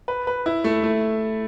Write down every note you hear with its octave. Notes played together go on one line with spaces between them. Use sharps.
B4
B4
E4
A3
A3